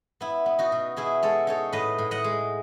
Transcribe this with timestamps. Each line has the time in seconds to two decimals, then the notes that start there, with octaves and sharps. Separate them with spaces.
0.21 B3 E4
0.46 B3
0.59 D#4 F#4
0.72 B2
0.96 B2 E4 G#4
1.22 G#3 A4 C#5
1.47 D#4 A4 C#5
1.72 A2 B4 D#5
1.98 A2
2.11 D#5 F#5
2.24 G#3